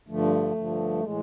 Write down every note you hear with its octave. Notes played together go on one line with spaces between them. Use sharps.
G2 D3 F3 A3
G2 D3 F3
A2 E3 G#3